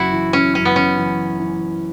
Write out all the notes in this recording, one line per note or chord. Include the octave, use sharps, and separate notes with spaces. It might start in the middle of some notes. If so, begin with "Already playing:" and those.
Already playing: F#1 F#2 E4 F#4
E3
C#4
F#2 C#4
B3
C#4
E3
E3